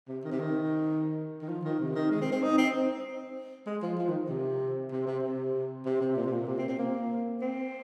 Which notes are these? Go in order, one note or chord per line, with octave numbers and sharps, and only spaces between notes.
C3
D#3
C3
D#3
D#3
F3
D#3
C3
D#3
G#3
C4
C4
D#4
C4
G#3
F3
F3
D#3
C3
C3
C3
C3
C3
C3
A#2
C3
A#2
C3
C4
C4
A#3
C4